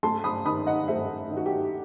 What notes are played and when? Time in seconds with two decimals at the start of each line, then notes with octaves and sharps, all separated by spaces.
0.03 A3 A5 C6
0.24 B5 D#6
0.45 D#3 B5 D#6
0.67 D#5 F#5
0.88 A3 C5 E5
1.31 D#3
1.37 F#4
1.46 G4